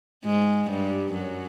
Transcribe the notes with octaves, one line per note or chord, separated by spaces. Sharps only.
G#2 G#3
G2 G3
F#2 F#3